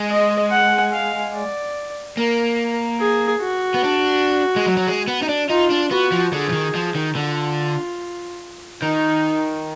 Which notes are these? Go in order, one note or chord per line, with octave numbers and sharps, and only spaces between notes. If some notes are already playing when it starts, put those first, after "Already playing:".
Already playing: G#3
D#5
F#5
F5
D5
A#3 A#4
G#4
F#4
B3
D4
G#3
F#3
F#3
G#3
B3
D#4
D4
D#4 F4
D4
B3 F#4
F3
D3 G#4
F3
D#3
F3
D#3
D3 F4
D#3 D#4